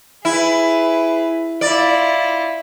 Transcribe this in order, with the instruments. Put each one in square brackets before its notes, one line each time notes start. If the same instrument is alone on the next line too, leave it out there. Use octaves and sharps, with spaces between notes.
[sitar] E4 [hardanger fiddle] G#4 B4
[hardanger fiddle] E4 F4 [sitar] D5